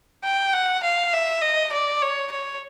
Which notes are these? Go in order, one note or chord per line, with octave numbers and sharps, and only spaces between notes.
G5
F#5
F5
E5
D#5
D5
C#5
C#5